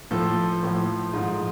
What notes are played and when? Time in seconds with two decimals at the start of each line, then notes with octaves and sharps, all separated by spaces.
0.11 A2 F3 A4
0.63 A2 F3
1.13 G#2 F3